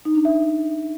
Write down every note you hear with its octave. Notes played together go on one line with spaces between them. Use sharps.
D#4
D4
E5